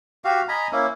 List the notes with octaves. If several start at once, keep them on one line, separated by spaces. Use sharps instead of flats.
F#4 G4 F5
D#5 G#5 A#5 B5
A#3 C#4 E4